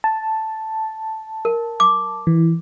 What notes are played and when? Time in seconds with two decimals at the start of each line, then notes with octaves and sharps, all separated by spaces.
0.04 A5
1.45 A#4
1.80 D6
2.27 E3